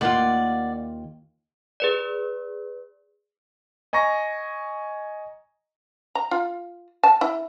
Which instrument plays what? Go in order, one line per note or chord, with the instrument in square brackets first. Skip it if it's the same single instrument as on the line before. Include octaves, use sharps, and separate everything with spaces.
[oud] D#2 A#3 F4 [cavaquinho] D5 F#5
[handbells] G#4 B4 D5
[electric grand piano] D#5 G#5 A#5 C#6 A#6
[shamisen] A#5
F4
A5
E4